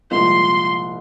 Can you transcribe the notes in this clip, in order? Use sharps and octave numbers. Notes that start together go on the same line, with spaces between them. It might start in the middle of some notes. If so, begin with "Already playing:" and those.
C2 A#2 F3 G#3 C6